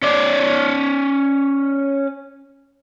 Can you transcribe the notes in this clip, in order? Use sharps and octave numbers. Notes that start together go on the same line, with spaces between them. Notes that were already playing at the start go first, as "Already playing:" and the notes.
C#4 D5